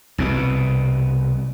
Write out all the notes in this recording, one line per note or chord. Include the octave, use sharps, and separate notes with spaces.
C2 B2